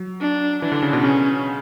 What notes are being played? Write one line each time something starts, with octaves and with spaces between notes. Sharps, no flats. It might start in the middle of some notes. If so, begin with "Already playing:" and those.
Already playing: F#3
D4
E3 D4
D3
C#3
B2
C#3 C#4